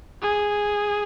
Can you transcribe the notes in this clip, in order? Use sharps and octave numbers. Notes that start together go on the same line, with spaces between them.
G#4